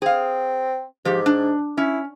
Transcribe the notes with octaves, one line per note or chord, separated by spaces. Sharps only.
C4 G#4 F5
G#2 F3 G4
D4
C#4 E4